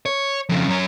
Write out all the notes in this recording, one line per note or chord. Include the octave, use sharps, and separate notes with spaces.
C#5
F2 C#3
F#2 C#4